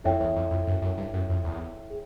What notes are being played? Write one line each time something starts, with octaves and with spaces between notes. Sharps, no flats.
F2 E4 A4 C#5 E5 G5
E2
F2
F2
F#2
F#2
G2
F#2
F2
E2
G#4